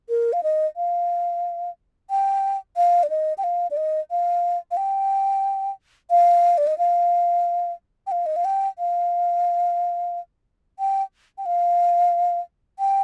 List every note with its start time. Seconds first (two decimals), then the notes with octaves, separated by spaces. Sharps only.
0.09 A#4
0.33 F5
0.43 D#5
0.76 F5
2.10 G5
2.77 F5
3.03 D5
3.10 D#5
3.38 G5
3.44 F5
3.71 D5
3.77 D#5
4.11 F5
4.71 F5
4.77 G5
6.10 F5
6.58 D5
6.67 D#5
6.78 F5
8.07 G5
8.12 F5
8.26 D#5
8.36 F5
8.45 G5
8.79 F5
10.79 G5
11.38 G5
11.46 F5
12.79 G5